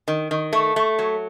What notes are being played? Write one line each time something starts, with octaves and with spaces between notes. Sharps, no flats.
D#3
D#3
A3
A3
F#3